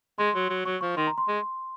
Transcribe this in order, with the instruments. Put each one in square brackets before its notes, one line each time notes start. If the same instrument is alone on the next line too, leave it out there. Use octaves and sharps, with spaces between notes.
[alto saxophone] G#3 [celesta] C6
[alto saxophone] F#3
F#3
[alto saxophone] F#3 [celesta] C#6
[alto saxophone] F3 [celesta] C#6
[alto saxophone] D#3 [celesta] C6
[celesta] A#5
C6
[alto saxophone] G#3